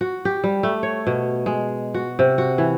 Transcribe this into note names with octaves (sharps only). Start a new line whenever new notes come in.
F#4
G4
G3
A3
C#5
B2
G#3
F#4
C3
F#4
E3